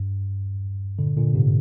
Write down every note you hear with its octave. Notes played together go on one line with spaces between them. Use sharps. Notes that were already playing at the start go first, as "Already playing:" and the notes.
Already playing: G2
A#2 D3
A#2 D3
G#2 C3